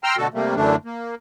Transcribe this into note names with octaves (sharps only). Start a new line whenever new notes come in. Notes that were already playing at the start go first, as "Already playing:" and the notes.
G5 A#5 C6 E6 F6
B2 D3 A3 F#4 A4
C3 G3 A3 A#3
F#2 D3 E3 A3 D4
A#3